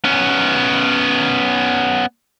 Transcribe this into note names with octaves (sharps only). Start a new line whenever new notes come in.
B3 C#4